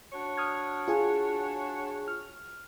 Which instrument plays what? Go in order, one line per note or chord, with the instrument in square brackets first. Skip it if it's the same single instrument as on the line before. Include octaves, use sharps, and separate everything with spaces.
[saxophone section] D4 F#4 C#5
[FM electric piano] D#6 F6 G#6
F4 G#4 G#5
F6